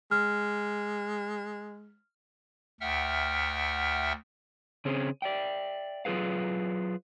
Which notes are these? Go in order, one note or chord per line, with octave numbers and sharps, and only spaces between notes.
G#3 F6
D2 E5 F#5 G5 F6
C#3 C4 C#4 G#4 C5
D5 E5 G5
F#3 F4 G#4 B4 F5